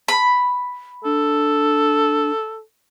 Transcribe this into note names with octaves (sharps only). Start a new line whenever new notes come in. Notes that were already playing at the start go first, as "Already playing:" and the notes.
B5
D4 A4